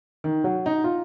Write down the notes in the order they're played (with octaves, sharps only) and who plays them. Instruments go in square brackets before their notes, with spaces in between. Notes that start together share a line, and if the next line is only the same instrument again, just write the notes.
[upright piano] D#3
F#3
D#4
F4